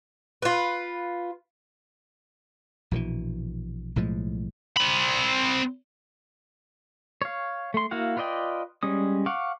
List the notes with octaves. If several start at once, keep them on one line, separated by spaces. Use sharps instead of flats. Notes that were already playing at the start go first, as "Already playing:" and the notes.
F4 B4
A#1 B2 D#3 E3
B1 A2 F3 G#3
C4 B5
C#5 F5
A3 C6
A#3 E4 F#4 F5 F#5
F4 B4 D5 D#5 G5
G3 G#3 C#4 D#6
F5 F#5 C#6 D6